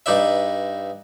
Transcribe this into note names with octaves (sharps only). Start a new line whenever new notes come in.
G2 D#4 B4 D5 E5